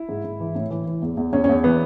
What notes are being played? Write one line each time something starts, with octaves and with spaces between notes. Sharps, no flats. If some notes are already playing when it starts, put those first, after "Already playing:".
Already playing: E4
G#2
G#2
E3
A2
E3
E3
E2
E2
E2 C#4
C#4
E2
E3 B3